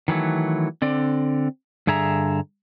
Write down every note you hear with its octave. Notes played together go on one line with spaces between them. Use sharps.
D#3 E3 F#3 A3
D3 C4 D5
G2 D3 G#4 E5 A#5